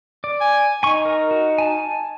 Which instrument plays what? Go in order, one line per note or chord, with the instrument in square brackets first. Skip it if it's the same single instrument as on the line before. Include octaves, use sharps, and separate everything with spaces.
[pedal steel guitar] D5
[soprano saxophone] G#5
[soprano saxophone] D#4 [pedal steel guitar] G#5 C#6
[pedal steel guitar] A#4
F#4
G#5 A5